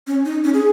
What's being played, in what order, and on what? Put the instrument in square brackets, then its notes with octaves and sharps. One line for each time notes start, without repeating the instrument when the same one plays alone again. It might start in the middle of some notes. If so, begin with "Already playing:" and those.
[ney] C#4
D#4
C#4
G#4